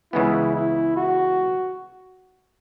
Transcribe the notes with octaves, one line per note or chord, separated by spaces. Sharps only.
C#2 C#3 E3 G#3 B3 E4
E4
F#4